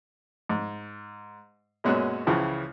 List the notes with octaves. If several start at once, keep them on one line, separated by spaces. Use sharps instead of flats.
G#2
F#2 A#2 G#3 B3 C#4 F#4
C#2 C#3 E3 F3